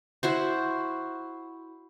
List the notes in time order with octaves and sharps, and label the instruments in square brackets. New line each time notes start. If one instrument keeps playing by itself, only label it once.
[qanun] E4 F#4 C5